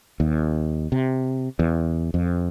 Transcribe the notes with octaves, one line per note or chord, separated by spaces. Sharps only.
D#2
C3
E2
F2